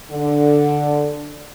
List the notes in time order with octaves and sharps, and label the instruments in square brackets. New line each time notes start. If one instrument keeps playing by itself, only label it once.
[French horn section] D3